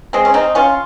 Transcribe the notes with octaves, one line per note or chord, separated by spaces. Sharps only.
G#3 C4
C#4
C4 D#4
C#4 F4